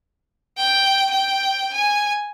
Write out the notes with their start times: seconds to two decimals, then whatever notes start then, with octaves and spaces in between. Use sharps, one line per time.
0.57 G5
1.10 G5
1.73 G#5